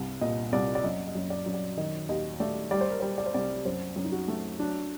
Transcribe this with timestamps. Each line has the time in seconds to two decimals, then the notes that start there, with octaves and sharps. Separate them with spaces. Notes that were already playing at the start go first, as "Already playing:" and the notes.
Already playing: C2 G2
0.21 A#2 D#5
0.52 C2 D5
0.75 D5
0.84 F#2 D#5
1.07 D#5
1.15 F#2
1.30 D5
1.46 F#2
1.54 D5
1.77 D#3 D#5
2.09 D#2 D#5
2.40 A3 D5
2.71 G3 D5
2.81 C5
2.91 A#4
3.00 G3 C5
3.18 D5
3.26 C5
3.34 C2 D5
3.65 F#2 C5
3.96 F#2
4.04 D#4
4.12 F#4
4.28 A3
4.59 F#3 D4